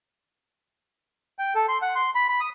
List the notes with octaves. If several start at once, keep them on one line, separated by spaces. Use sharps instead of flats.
G5
A4
C6
F#5
C6
B5
B5
D#6